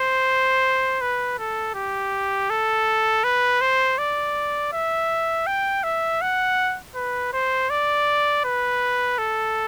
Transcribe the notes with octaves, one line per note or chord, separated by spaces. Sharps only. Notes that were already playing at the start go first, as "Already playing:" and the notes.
Already playing: C5
B4
A4
G4
A4
B4
C5
D5
E5
G5
E5
F#5
B4
C5
D5
B4
A4